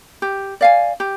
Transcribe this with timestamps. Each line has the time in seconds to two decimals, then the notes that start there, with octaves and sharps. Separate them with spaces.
0.22 G4
0.61 D5 F5 G#5
1.00 G4